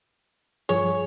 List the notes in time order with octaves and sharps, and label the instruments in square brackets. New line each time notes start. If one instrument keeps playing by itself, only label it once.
[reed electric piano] G2 F3 G#4 [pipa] C#5